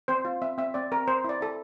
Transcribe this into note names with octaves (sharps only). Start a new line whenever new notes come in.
C4 C5
F4
C4 E5
C4 E5
C4 D5
C4 A#4
C4 C5
E4 D5
E4 A4